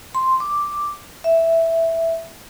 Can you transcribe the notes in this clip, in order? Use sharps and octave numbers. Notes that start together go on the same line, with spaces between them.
C6
D6
E5